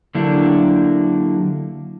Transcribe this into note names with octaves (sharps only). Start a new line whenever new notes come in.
D3 F#3 A#3 D4 E4 G4